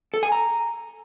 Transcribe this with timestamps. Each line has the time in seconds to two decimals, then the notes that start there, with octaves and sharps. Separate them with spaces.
0.14 A4
0.23 G#5
0.32 A#5